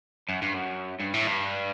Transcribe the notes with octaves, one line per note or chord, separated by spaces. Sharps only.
F#2
G2
F#2
G2
A2
G2